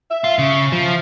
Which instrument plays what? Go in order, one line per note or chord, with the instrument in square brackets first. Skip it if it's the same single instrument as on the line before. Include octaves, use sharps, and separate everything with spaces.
[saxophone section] E5
[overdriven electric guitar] F4
C#3
F3